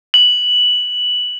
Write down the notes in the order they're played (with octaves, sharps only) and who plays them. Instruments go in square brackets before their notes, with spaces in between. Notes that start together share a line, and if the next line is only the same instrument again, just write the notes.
[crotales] F#7